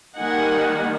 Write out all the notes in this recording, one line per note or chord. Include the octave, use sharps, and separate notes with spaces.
D#3 G3 A#3 D#4 F#5 G#5